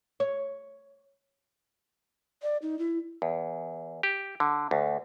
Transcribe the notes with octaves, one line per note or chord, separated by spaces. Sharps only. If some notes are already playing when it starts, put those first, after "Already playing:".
C#5
D5
D#4
E4
E2
G4
D3
D2